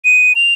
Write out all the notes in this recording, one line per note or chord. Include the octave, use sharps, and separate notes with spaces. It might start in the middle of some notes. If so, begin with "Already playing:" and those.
D#7
F7